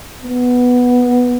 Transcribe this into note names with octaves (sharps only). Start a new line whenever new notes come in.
B3